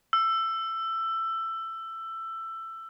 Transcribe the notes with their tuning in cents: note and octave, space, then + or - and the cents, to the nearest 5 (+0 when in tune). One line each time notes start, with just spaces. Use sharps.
E6 +15